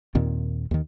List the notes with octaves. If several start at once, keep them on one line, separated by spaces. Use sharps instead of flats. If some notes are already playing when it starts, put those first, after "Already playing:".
D#2 A#2 D#3 C4
D#2 D#3